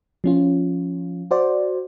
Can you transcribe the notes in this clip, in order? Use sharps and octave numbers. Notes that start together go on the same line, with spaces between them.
F3 C#4 F4
F#4 C5 D5